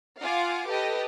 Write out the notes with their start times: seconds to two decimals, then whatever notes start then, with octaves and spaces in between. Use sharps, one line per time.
0.22 F4 F5 F#5 G#5 D6
0.67 G4 A4 B4 D#5